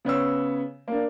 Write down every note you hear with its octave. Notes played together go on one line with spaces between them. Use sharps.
C#3 B3 C#5 E6
A#3 D4